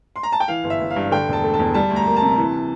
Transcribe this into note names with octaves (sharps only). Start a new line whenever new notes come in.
C6
A#5
A5
G5
E3 F5
G1
E5
G1
F5
G2
D3 G5
E1 A5
A3
A5
E2
G3 A5
D2
A#5
A#3
A5
C3
E3